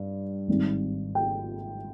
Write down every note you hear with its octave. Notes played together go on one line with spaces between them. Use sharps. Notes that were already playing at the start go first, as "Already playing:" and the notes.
Already playing: G2
G#1 G#2 G3 C4
G5